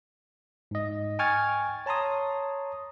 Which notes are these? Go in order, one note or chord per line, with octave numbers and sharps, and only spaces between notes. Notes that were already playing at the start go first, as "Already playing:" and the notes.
G#2 D#5
G5 G#5 C#6 F6 G#6 A6
C#5 A5 A#5 C6 D#6